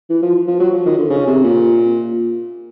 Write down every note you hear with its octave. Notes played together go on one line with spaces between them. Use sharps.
E3
F3
F3
F#3
F3
D#3
D3
C#3
C3
A#2